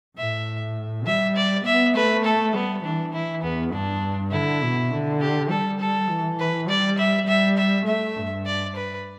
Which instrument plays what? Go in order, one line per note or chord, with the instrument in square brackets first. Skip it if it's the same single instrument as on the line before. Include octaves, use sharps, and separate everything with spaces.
[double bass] A2 [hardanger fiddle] E5
[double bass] G3 [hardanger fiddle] E5
[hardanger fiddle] D5
[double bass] B3 [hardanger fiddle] E5
[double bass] A3 [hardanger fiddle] B4
[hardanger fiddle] A4
[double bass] G3 [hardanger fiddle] B3
[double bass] E3 [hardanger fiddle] D4
[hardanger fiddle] E4
[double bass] E2 [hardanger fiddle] B3
[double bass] G2 [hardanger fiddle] D4
[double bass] D3 [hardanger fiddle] E4
[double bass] B2
D3
[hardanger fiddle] G4
[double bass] G3 [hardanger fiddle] A4
[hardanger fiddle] A4
[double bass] E3
[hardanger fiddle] B4
[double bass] G3 [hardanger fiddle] D5
[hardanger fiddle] E5
[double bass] G3 [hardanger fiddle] E5
[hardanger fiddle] E5
[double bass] A3 [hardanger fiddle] E5
[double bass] G2
[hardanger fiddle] D5
B4